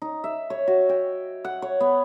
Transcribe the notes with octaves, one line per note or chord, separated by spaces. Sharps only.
D#4
E5
C#5
F#4
G5
F#5
C#5
B3